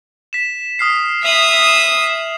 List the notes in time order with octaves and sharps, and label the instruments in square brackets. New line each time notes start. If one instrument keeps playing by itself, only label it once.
[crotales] B6 E7
D#6 F6 C7
[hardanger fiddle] E5 D#6 [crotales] C7 F7 F#7
[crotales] C7 E7